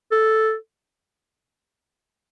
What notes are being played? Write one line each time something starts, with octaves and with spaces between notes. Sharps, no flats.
A4